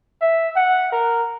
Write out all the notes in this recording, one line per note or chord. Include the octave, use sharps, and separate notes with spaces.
E5
F#5
A#4